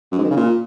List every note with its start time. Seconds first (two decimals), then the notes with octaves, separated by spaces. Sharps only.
0.12 F#2
0.18 G#2
0.24 D#3
0.30 C#3
0.37 A#2